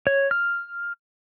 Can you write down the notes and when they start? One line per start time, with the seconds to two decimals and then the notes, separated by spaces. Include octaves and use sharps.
0.07 C#5
0.31 F6